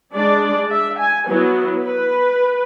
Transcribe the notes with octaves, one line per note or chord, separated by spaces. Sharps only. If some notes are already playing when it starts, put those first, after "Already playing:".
G#3 D4 D5
E5
G#5
F#3 B3 E4
B4